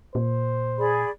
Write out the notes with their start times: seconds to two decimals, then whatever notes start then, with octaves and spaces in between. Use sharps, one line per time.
0.15 A#2 C5
0.78 G#4 D5 B5